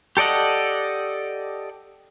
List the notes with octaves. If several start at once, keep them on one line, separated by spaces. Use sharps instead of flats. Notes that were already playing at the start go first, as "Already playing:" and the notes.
G4 A4 D5 D#5 F#5